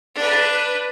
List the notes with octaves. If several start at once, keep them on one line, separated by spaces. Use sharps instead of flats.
D4 B4